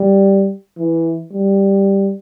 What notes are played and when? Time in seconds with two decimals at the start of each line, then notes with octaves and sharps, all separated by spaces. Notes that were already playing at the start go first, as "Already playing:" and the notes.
Already playing: G3
0.78 E3
1.32 G3